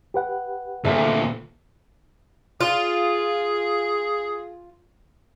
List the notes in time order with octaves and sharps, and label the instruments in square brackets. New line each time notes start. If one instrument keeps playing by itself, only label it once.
[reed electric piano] G4 B4 F#5
[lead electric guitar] D2 A#2 [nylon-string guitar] A4 E5 A5
[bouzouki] F4 [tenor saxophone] G#4